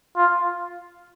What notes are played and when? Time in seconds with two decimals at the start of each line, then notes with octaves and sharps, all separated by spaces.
0.16 F4